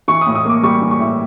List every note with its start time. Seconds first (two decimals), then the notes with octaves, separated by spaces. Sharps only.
0.08 E3 C#6
0.21 D#6
0.27 A2
0.35 D#6
0.45 A#3 D6
0.63 G3 C#6
0.82 E3
0.91 C#6
1.00 A2